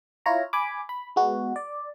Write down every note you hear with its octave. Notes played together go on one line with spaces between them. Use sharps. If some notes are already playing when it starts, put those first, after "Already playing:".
E4 F4 C#5 A#5
G#5 B5 D6
B5
G#3 B3 F#4
D5